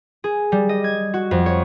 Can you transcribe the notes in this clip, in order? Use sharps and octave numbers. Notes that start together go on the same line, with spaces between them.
G#4
G3
D#5
G#6
F#4
F2
C#5